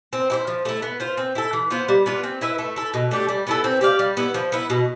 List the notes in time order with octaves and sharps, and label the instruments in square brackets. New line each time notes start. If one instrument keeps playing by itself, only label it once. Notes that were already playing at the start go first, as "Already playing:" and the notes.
[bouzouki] C4
E4 G4 C5
F3
A3 E4
B3
F4 C5
C4
E4 A4
E3
B3 F4 C5
G3
B3 D4 F4
C4
E4 B4 E5
A3
E4 A4
B2
A3 D4 G4
G3
B3 E4 A4
C4
G4 D5 F5
G3
B3 E4
F3
B3 E4
B2